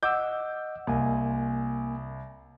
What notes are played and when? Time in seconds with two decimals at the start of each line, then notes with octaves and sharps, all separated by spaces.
0.03 D#5 F#5 D6 E6 G6
0.87 C2 A#3 G#5